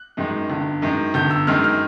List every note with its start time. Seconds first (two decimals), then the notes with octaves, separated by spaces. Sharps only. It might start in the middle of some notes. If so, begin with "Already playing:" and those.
Already playing: F#6
0.17 F#2 D#3 G#3
0.50 G1
0.82 F#2 D#3 G#3
1.14 G1 G6
1.31 E6
1.47 F#2 D#3 G#3 F6
1.64 F6